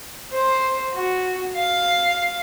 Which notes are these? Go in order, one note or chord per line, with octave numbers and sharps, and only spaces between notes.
C5
F#4
F5